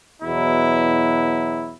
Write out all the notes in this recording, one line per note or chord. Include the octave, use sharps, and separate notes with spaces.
E2 B2 F#3 E4